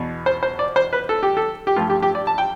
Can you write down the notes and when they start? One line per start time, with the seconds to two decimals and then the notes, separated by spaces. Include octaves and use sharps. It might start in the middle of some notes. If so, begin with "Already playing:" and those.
Already playing: E2 B2
0.26 C5
0.43 C5
0.59 D5
0.76 C5
0.93 B4
1.09 A4
1.23 G4
1.37 A4
1.67 G4
1.76 G2 F3 A3 F4
1.90 G4
2.02 G4
2.15 D5
2.27 A5
2.38 G5